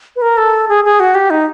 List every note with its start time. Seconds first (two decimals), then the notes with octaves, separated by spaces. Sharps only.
0.16 B4
0.22 A#4
0.37 A4
0.69 G#4
0.85 G#4
1.00 F#4
1.15 G4
1.30 D#4